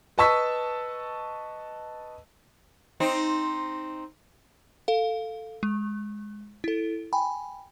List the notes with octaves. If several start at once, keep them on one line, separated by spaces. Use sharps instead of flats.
B4 D#5 A5 C#6 E6 B6
C4 D#4
A4 F5
G#3
E4 A4
G5 G#5 B5